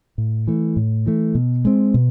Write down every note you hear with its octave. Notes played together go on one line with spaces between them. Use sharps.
A2
E3 A3
A2
E3 A3
B2
G#3 C4
B2